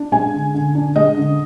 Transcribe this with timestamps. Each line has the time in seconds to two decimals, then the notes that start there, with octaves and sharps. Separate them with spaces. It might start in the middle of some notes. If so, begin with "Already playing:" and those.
Already playing: D4
0.12 G#3 G#5
0.34 D3
0.54 D3
0.75 D4
0.96 G#3 D#5
1.17 D3